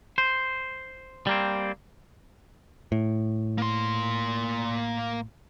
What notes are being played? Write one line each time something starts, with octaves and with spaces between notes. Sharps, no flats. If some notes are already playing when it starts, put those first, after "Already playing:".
C5
G3 A#3 C4
A2
A#3 C6